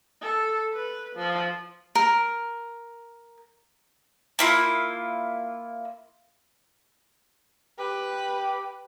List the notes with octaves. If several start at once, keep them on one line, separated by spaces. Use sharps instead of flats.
A4
B4
F3
A#4
A#3 E4 F4
G4 B4